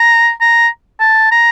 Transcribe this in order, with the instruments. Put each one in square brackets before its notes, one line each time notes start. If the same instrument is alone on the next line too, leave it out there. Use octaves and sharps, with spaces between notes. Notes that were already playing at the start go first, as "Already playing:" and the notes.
Already playing: [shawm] A#5
A#5
A5
A#5